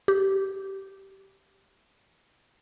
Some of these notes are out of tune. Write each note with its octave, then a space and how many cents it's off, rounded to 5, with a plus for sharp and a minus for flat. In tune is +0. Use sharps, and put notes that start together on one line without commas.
G4 -20